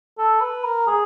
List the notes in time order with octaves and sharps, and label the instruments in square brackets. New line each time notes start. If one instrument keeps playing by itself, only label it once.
[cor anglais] A4
B4
A#4
G#4